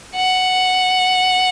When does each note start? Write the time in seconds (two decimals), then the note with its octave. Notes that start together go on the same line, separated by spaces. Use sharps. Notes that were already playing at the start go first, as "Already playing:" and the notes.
0.16 F#5